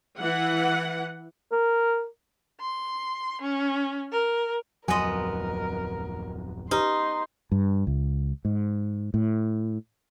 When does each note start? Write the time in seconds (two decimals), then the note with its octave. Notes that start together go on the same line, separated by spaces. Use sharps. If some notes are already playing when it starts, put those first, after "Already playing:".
0.19 E3 F#5
1.52 A#4
2.61 C6
3.42 C#4
4.12 A#4
4.88 D1 F2 F#3 B3 A#4 D#5 G#5 C6
6.71 D#4 G4 B4 A#5 C6
7.52 G2
7.87 C#2
8.45 G#2
9.14 A2